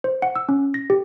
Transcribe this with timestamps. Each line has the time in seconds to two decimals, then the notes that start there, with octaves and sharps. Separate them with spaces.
0.04 C5
0.22 F#5
0.36 E6
0.49 C#4
0.74 A#6
0.90 G4